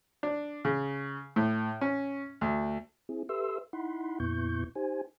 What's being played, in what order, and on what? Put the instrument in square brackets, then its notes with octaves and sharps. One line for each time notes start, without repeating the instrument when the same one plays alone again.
[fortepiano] D4
C#3
A2
C#4
D2
[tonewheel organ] C4 E4 G#4
G4 A4 B4 E5 C6 E6
D#4 E4 F#5 B5 C6
F2 A#2 B3 E4 C#6 G6
D#4 G4 C5 G#5